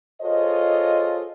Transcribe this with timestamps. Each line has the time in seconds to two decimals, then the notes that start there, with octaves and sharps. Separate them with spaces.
0.22 F4 G#4 A4 C5 C#5 D#5